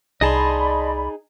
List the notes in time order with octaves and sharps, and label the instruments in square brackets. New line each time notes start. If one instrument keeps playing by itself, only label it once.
[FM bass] C2 [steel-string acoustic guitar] D#4 G#4 [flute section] D5 B5 [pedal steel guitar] D#5 A5 C6